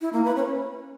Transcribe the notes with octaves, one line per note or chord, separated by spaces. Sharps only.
E4
A#3
B4
C#4